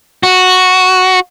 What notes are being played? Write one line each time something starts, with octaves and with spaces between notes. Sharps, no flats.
F#4